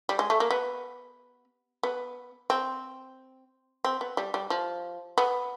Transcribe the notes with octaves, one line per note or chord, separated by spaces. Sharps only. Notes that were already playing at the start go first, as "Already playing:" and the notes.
G3
G#3
A3
A#3
B3
B3
C4
C4
B3
G3
G3
F3
B3